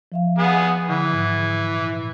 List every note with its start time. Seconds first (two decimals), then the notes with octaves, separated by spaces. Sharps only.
0.12 F3 E5 F5
0.39 B3 G#4 F#5
0.89 D3 E3
1.13 G#2
1.76 A#2